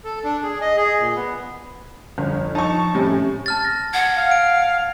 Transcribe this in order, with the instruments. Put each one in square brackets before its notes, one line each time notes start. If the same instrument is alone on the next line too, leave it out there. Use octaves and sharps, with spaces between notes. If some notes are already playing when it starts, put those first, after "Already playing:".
[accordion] A4
D4
G#4
D#5
G#4
A#2
B3
[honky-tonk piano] G1 [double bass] F2
[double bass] F3 [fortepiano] D#4 [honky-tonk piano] A5 C#6
[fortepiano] A2 C3 G3 [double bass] C#4
[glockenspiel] A5 F6 A6
A#6
[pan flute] F#5 [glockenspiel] G#6
[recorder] F5
[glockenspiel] D7